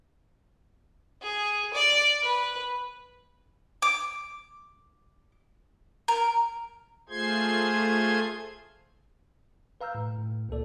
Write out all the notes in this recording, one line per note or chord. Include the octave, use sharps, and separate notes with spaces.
G#4
D5
B4
D6
A#4
A3 F4 G#4 C5 C6 G#6
B4 F5 A#5 E6 F6 G6
A2
A2
C#2 A#2 A#3 A4 D5